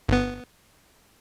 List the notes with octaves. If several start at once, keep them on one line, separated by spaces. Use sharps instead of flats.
G1 B3